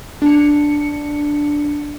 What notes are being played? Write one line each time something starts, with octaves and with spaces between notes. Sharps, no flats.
D4 C#7